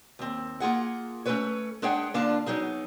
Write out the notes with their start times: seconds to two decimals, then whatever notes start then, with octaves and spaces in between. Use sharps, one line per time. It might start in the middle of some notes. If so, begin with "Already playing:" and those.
0.19 D#2 C4
0.60 A#3 F4 G#4 F#5
1.26 A3 C#4 F4 A4 B4 C#5
1.82 G#3 D4 G#4 C#5 F#5 G5
2.14 D3 A#3 D4 F4 F5 A5
2.46 F#3 B3 D#4 G#4